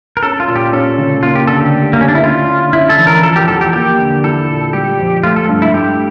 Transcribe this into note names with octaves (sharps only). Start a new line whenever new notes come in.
A#4
C#4 A4
F4
A#2
G4
C#4 A4
C#3
A#3 F4
G4
D3 A4
G4
A3
A#3
D3 C#4
D4
E4
C#4 F4
D3
C#4 E4
A4
E3
A#4
F3 A4
G4
E2 A4
G4
A#3 G4
D3
E4 A4
A#2
G3 G4
F2
A3 F4
A4
G2
E4
A3 G4